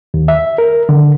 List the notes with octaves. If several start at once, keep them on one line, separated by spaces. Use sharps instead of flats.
D#2
E5
A#4
D3